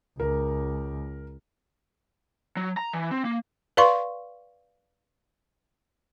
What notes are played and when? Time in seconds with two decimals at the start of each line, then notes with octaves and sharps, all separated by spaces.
0.20 C#2 A#4
2.57 F#3
2.77 A#5
2.93 E3
3.11 C4
3.25 A#3
3.77 B4 D5 F5 C6 C#6